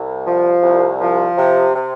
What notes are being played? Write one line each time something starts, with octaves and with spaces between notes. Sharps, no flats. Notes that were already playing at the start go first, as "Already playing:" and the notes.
Already playing: C2
F3
C2
F3
C3
C3